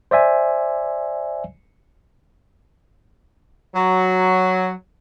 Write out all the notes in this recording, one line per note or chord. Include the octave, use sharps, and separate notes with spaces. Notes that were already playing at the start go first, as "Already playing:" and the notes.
C5 D5 E5 G#5
F#3